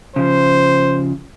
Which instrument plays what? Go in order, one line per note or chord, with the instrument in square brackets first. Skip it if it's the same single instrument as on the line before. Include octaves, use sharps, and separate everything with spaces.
[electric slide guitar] C#3 F3 [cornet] C5